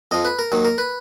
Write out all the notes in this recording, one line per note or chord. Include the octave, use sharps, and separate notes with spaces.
F2 F3 D#5
B4
A#4
D#2 D#3 F#3
A#4
B4